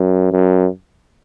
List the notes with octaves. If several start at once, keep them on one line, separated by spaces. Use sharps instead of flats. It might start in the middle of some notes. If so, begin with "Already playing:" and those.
Already playing: F#2
F#2